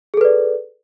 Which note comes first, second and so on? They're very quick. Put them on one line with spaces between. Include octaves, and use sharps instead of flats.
G#4 A4 B4 D5